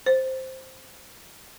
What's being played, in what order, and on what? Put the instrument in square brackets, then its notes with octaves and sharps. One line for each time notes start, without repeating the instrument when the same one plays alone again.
[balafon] C5